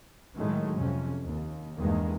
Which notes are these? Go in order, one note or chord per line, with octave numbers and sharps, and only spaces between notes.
A2 D#3 F#3 G#3 A3
F2 C3 C#4
D#2
E2 G2 D#3 G#3 A#3